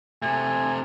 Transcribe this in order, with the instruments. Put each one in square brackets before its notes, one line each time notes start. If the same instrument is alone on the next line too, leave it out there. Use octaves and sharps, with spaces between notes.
[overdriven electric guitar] C3 A3 [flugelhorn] G#5